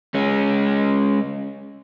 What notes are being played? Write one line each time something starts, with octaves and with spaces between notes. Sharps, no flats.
G#3 C#4